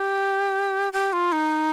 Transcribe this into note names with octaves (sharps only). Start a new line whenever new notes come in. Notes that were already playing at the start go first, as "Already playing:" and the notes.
Already playing: G4
G4
F4
D#4